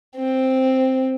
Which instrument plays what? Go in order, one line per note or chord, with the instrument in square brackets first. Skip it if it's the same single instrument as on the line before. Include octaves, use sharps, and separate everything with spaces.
[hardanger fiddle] C4